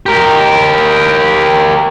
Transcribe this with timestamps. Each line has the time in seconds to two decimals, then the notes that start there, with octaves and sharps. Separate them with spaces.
0.06 G4 A#4